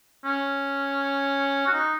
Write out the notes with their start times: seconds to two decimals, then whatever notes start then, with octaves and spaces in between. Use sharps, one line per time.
0.25 C#4
1.67 F#4
1.73 D#4